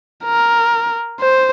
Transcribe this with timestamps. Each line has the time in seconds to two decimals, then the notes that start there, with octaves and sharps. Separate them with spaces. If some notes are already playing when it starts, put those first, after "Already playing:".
0.25 A#4
1.20 C5